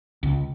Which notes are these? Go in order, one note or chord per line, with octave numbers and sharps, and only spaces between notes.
C#2